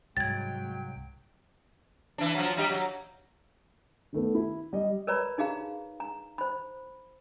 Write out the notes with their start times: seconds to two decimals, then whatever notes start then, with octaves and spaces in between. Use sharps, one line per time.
0.17 C2 G#2 F#3 G5 G#6 A6
2.18 E3 D4
2.34 F3 F#3
2.57 G3 D#4 G4
2.70 F#3
4.13 D#3 A3 B3
4.35 E4
4.73 G3 D#5
5.07 A#4 B4 C#5 D5 A#5 B5
5.38 D#4 F#4 G#4 F5 A#5
6.00 A#5
6.38 C5 B5